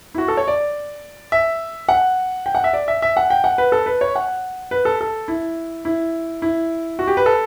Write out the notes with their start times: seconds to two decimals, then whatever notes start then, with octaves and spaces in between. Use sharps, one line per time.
0.14 E4
0.18 F#4
0.28 A4
0.37 C#5
0.48 D5
1.32 E5
1.89 F#5
2.46 G5
2.55 F#5
2.64 E5
2.73 D5
2.88 E5
3.02 E5
3.17 F#5
3.30 G5
3.44 F#5
3.58 B4
3.72 A4
3.86 B4
4.01 C#5
4.15 F#5
4.71 B4
4.85 A4
5.01 A4
5.28 E4
5.85 E4
6.42 E4
6.99 F#4
7.07 G4
7.17 B4
7.26 A4